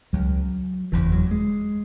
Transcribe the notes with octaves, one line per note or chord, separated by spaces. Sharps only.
C#2 C#3 F#3
F#1 E2 C#3 E3
F#3
G#3